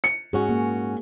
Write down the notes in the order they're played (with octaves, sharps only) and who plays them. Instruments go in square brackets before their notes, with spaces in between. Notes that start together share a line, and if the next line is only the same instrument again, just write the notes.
[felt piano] C#7
[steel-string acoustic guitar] G#2 C#4 F#4 [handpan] G#4
[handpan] A#3 G#4